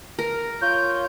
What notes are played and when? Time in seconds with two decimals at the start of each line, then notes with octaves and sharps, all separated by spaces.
0.19 A#4
0.61 F4 C#5 G6